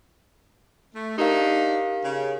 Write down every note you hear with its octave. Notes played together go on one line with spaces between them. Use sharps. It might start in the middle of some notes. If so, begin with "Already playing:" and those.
A3
D4 D#4 G4 A#4 F5
C#3